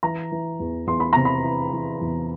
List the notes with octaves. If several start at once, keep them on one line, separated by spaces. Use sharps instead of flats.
E3 A#5
E3
E2
E2 C6
B5
C3 A#5
B5
E3
E3
E2